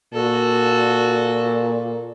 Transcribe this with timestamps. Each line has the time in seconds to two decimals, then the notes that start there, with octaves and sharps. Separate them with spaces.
0.14 A#2 F#4 A4